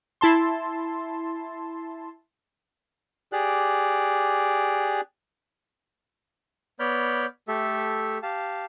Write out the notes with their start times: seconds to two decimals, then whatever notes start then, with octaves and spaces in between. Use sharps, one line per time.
0.21 E4 A5 C6
3.32 G4 G#4 D5 F#6
6.80 B3 C#5 D5 B5 F6 G6
7.48 A3 G4 A4 E5
8.23 G4 F5 A5